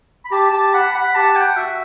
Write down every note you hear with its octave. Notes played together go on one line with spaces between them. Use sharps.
B5
G4 A5
G4 A5
F#5 B5
F#5 B5
G4 A5
F#5 G5
F#4 E5